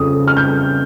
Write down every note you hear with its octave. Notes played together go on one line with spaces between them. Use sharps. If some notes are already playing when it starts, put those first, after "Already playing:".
Already playing: F2 C#3 D#6
F6
G6